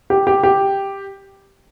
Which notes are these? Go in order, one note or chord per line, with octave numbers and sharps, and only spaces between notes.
G4
G4
G4